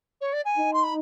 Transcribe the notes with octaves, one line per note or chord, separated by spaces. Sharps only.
C#5
D5
G#5
D#4
C6
B5